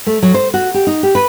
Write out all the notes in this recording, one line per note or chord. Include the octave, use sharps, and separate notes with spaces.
A3
F#3
C5
F#4
G4
D#4
G4
B4